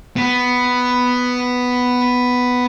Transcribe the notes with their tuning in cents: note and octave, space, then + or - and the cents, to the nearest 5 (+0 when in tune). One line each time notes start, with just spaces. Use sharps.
B3 +5